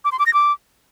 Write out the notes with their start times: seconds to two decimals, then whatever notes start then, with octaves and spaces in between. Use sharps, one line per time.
0.05 D6
0.12 C6
0.19 D6
0.26 A#6
0.34 D6